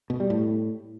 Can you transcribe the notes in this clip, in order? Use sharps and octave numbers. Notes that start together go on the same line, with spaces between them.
B2
G3
A2